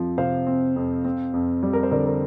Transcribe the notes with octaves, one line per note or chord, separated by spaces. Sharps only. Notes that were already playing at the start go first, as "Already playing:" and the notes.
Already playing: F2 F3 C4
C3 C5 F5
C4
F2
C4
F2
G3
A#4
C5
D3 A#4 D5
A#4